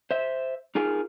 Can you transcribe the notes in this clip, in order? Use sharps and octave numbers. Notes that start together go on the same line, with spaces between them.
C5 E5
D#4 F4 G#4 A#4